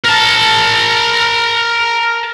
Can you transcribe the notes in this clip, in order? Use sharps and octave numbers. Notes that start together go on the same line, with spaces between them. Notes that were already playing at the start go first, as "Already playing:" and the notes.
A#4 A5